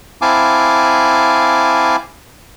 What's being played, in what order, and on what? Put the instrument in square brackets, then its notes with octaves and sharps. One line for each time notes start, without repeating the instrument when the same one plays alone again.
[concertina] C4 E4 F5 G#5 A5 D6